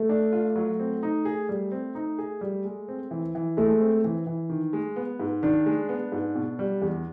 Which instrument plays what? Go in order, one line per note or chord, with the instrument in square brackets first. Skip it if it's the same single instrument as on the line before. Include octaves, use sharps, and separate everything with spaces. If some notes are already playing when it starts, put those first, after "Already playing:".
Already playing: [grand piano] A3
[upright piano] D4
F4
F#3
C4
D#4
G#4
G3
C4
D#4
G#4
G3
G#3
C4
E3
E3
[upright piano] G#3 [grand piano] A3
[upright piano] C4
E3
E3
D#3
G#3
B3
G#2
[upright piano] D#3 [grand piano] D4
[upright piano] G#3
B3
G#2
B2
G3
E2